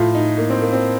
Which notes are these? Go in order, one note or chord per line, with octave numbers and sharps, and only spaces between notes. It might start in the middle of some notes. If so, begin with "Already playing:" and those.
Already playing: A2 F3 F4
D#4
A#3
C4
A#3
C4